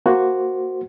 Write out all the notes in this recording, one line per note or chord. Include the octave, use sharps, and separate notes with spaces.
A#3 F#4 C5